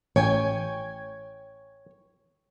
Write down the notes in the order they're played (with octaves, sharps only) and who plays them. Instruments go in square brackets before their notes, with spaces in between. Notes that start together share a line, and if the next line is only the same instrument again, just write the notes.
[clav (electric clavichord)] A1 [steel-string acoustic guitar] C#5 G5 G#5